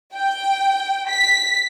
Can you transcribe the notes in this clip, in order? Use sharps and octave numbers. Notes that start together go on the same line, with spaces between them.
G5
B6